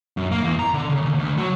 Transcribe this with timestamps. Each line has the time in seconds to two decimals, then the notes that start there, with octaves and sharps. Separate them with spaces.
0.17 F#2
0.31 A#3
0.44 E2
0.59 A#5
0.74 D3
0.90 C#3
1.02 D#2
1.15 D2
1.38 F#3